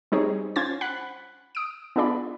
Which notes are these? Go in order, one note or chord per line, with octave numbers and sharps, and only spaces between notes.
G3 C4 D#4 G#4 C#5
C#4 F4 C5 G#6 A6
F#5 B5 F#6
D#6 D7
B3 D4 F4 G#4 D5 B5